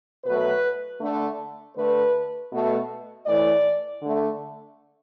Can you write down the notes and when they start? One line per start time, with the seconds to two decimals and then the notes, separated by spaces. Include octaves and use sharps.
0.24 B2 F#3 A3 B4
1.00 D3 A3
1.75 D3 A3 B4
2.50 B2 A3
3.25 A2 E3 A3 D5
4.00 D3
4.05 A3